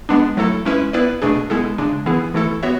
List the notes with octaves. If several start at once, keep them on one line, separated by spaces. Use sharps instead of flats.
G#3 B3 D4
F#3 A3 E4 A4
G#3 C#4 E4 B4 E5
B3 E4 B4 D5
B2 A3 D4 G#4
G#3 B3 E4 A4
C#3 G#3 D4
E3 B3 E4 G#4
E3 A3 E4 A4
B3 F#4 C#5 E5